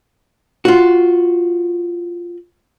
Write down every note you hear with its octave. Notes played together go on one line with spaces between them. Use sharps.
F4 F#4